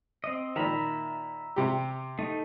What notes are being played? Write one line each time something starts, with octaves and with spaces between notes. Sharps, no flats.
C4 D#5
A#2 D#3 E5 A#5 B5
C3 G4
A3 D#4